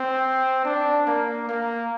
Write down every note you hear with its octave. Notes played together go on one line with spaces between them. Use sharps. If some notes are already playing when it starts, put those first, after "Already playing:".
Already playing: C4
D4
A#3
A#3